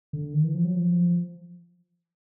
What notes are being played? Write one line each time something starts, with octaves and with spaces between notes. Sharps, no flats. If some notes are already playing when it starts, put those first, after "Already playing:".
D3
D#3
E3
F3
F#3
F3